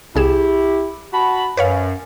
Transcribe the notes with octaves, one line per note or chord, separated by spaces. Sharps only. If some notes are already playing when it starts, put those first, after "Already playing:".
C2 E4 G4 G#4 E7
F#4 A5 B5
F#2 B4 C#5 F5